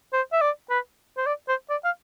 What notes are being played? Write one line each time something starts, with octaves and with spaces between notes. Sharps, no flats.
C5
E5
D5
B4
C5
D5
C5
D5
F5